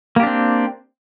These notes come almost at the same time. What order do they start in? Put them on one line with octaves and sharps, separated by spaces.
A#3 G4 D4 C4